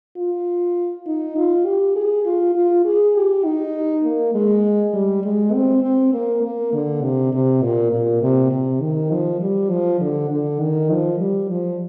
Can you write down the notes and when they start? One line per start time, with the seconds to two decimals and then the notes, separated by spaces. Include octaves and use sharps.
0.17 F4
1.06 D#4
1.37 F4
1.66 G4
1.96 G#4
2.26 F4
2.55 F4
2.85 G#4
3.15 G4
3.45 D#4
4.04 A#3
4.34 G#3
4.94 G3
5.24 G#3
5.53 C4
5.83 C4
6.13 A#3
6.43 A#3
6.73 D3
7.02 C3
7.33 C3
7.62 A#2
7.92 A#2
8.22 C3
8.51 C3
8.81 D#3
9.11 F3
9.41 G3
9.70 F3
10.01 D3
10.30 D3
10.60 D#3
10.90 F3
11.19 G3
11.49 F3